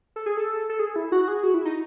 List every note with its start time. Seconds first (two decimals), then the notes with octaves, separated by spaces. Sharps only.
0.16 A4
0.26 G#4
0.37 A4
0.69 A4
0.79 G#4
0.96 E4
1.12 F#4
1.28 G#4
1.44 F#4
1.54 E4
1.65 D#4